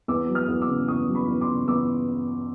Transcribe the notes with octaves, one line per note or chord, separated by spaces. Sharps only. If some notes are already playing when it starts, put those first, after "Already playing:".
E2 D6 E6
F#3
D#6 F6
E2
D6 E6
C#3
E2 C#6 D#6
F#3
B5 C#6
E2
C6 D6
C#3
E2 D6 E6